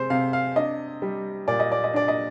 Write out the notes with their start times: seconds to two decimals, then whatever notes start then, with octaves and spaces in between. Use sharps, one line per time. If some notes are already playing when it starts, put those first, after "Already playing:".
Already playing: C3 G#3 C5
0.10 C3 F5
0.33 F5
0.56 D4 D#5
1.02 G3
1.48 A#2 D5
1.60 D#5
1.72 D5
1.84 D#5
1.93 D4 D5
2.08 D#5